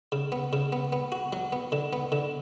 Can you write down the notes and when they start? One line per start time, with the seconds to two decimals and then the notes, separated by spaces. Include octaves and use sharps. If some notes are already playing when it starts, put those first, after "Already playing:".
0.12 C#3
0.32 B3
0.53 C#3
0.72 B3
0.93 B3
1.12 F#4
1.33 F#3
1.52 B3
1.72 D3
1.93 B3
2.12 D3